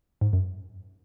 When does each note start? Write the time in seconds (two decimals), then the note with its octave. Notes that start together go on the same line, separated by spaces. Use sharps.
0.21 G#2
0.33 F#2